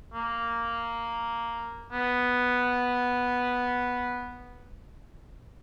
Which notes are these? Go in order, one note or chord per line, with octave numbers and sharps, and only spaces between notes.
A#3
B3